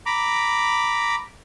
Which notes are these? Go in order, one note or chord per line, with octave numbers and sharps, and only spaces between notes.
A#5 B5 D6